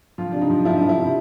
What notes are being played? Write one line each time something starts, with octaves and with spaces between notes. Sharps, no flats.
F3 F4
C3 D4
D#4
F3
F3 E4
F3
E4
C3